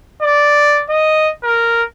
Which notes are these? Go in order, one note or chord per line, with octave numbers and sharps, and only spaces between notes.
D5
D#5
A#4